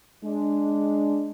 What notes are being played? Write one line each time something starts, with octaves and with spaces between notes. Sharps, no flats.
G#3 D4